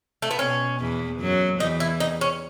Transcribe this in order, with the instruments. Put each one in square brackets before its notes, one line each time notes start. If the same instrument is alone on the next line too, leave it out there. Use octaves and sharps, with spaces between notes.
[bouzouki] A3
B3
[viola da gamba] B2 [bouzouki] C#4
[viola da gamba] E2 E3
F#2 F#3
[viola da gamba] E2 E3 [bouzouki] D#4
[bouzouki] E4
D#4
C#4